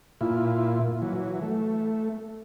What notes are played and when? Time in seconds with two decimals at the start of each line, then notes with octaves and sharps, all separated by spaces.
0.21 A#2 E4 F4
1.02 E3 F#3
1.42 A3